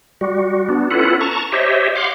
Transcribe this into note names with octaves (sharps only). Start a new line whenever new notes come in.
G3 F#4
B3 D4
C#4 E4 F4 A4 B4 F#5
A5 A#5 C#6
G4 C5 C#5 D#5 E5
F5 F#5 C6 D6